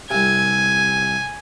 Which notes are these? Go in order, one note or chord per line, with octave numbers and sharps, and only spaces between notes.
C2 C3 G#5